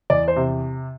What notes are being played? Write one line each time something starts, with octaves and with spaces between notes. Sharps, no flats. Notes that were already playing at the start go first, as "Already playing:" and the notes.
E2 D5
C5
C3